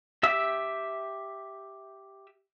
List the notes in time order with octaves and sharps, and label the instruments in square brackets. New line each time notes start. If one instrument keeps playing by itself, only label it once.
[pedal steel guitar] G4 E5 E6